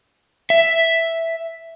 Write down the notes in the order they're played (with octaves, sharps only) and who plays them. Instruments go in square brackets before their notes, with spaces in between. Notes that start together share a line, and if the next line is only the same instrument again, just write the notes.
[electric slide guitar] E5